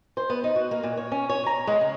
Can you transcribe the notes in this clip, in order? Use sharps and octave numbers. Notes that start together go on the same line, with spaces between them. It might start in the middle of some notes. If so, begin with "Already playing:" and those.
C5
B3
D#4
F#4
A#3
A#2
C#5
C#4
C#5
A#5
G#3
C#3